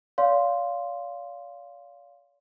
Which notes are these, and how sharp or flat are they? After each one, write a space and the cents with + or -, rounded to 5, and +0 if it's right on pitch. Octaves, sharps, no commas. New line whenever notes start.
D5 -45 F5 +0 C6 +0